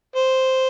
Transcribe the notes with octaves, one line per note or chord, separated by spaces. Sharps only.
C5